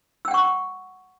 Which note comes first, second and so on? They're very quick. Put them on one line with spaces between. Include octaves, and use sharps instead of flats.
E6 G5 F#5 C#6